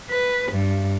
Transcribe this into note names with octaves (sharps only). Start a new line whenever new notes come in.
B4
G2